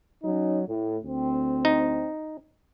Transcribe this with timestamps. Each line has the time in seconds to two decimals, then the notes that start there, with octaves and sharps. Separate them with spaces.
0.24 F#3 C#4 D#4
0.68 A2
1.04 D2 C4
1.65 D#4